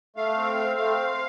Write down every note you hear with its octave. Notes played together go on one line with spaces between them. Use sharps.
A3 F5
C4
C4
A3 F5